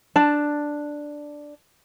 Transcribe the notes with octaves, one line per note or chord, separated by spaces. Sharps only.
D4 A5